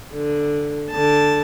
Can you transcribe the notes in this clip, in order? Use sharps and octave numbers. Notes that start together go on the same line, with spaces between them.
D3
D3 A5